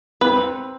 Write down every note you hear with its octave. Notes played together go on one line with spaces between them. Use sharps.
C4 B4